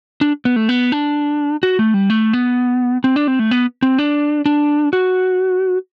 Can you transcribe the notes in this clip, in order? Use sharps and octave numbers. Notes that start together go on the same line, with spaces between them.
D4
B3
A3
B3
D4
F#4
A3
G3
A3
B3
C4
D4
C4
A3
B3
C4
D4
D4
F#4